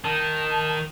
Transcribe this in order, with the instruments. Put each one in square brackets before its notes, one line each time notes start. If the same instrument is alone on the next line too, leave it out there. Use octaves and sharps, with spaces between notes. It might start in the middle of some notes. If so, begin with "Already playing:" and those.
[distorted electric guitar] D#3 [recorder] A5